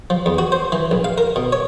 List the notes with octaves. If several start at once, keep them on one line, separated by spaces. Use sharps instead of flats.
F3
E2
F#4
C5
E3
A#1
F5
A#4
B2
C#5